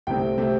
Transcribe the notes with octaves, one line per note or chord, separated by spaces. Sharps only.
C2 C3 A3 C4 G5
C3 A3 C4